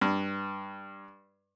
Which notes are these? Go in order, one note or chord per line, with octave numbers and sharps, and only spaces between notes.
G2